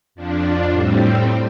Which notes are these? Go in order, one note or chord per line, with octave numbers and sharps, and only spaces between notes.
F2 F3 D4
A2 G3 C4